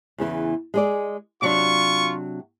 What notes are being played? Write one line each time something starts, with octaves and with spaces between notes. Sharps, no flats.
E2 C#3 E3
G#3 G#4 D5
C3 F#3 D4 F4 C#6